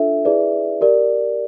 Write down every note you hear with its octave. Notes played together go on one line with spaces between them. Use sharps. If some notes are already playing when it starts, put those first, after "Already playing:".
Already playing: D4 F4 A4 E5
E4 G#4 B4 D5
G4 A#4 D5